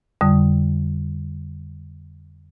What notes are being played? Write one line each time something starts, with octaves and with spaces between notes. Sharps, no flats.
F2 D3 G3 D#6